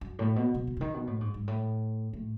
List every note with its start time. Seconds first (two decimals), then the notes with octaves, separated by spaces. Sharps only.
0.01 F#2
0.19 A2
0.36 B2
0.54 B2
0.67 D#3
0.77 C#3
0.81 D#3
0.94 B2
1.07 A2
1.21 G#2
1.34 G#2
1.48 A2
2.13 A2